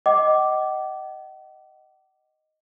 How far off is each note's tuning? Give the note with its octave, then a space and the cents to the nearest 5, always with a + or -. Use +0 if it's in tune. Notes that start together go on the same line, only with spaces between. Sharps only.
D#5 +0 F#5 +45 D6 +0